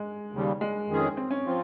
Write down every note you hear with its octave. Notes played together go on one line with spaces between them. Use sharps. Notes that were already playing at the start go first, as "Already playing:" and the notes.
Already playing: G#3
D#2 C#3 G3
G#3
F2 D#3 G#3 C#4 G#4
C4
C#4
F3 C4 F4